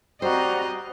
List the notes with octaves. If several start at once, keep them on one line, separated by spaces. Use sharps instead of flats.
G3 C4 F#4 C5 D#5 A#5